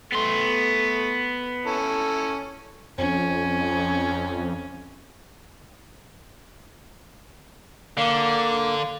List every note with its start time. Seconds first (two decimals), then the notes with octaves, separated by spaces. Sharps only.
0.12 A3 B3 C6
1.66 C#4 E4 A4
2.98 F2 C#4
7.97 D3 A#3